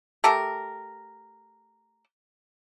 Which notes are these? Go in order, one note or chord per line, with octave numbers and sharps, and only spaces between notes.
A3 G4 A4 A#4